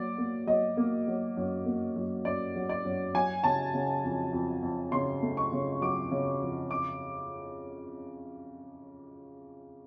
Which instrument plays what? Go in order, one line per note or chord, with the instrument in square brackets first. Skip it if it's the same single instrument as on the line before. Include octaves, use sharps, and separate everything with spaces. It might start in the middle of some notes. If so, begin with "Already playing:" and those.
Already playing: [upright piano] F#3 A#3 D5
A#3
F#3 D#5
A#3
F#3
F#2
A#3
F#2
F#2 D5
F#3
D5
F#2
F#3 G#5
C#3 A5
C#3
F2
F2
F2
C#3 C6
A3
C#6
C#3
F#3 D6
C#3
F2
D6